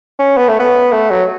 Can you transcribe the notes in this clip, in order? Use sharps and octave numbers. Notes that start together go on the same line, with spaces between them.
C#4
B3
A3
B3
A3
F#3